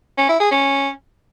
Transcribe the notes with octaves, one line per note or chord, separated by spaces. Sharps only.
C#4
E4
G#4
C#4